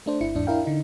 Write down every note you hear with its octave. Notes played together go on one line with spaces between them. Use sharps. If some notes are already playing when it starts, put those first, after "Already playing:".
A3 D4 C5
G1 E4 C#7
E2 G#2 D4
D4 E4 A#4 F5 G5
D3 D#4